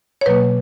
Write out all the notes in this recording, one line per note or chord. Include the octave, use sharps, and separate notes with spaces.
C#5
B2 F#3 A#3 B4